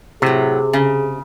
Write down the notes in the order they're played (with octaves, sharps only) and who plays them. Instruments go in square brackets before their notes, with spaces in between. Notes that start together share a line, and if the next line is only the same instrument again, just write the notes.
[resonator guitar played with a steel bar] A2 F#3 [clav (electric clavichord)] C3 [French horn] G#4
[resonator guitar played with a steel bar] C#3